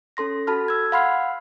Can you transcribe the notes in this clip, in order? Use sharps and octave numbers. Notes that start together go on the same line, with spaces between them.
C#4 A4 C6 A#6
F#4 A4 A5 B5 F6
E6 G#6
F5 F#5 B5 C6 F6 C7